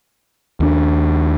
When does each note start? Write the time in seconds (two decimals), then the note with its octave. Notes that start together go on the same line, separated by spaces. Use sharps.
0.60 D#2 D4